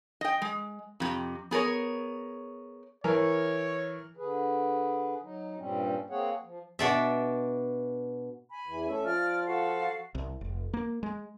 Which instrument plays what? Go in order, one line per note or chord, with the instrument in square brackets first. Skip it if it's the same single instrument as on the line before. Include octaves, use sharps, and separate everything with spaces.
[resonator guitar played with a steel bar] D#5 G5
G#3
F2 C3
B3 G#4 A#4 C#5
[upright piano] E3 A#4 [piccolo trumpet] C#5
[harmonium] D3 G#4 B4
F#3 D#4
G2 A#2 G3 C4 C#4
A#3 C4 G#4 C#5 F#5
F3
[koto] B2 D4 E5
[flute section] G#5 B5
[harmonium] E2 E3
A3 C#4 E5
[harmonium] F3 F4 [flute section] D5 F6
[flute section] F#4 A4 F5
[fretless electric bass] C2
F1
A#3
G#3